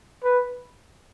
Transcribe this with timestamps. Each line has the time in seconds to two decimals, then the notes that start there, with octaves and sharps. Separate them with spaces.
0.24 B4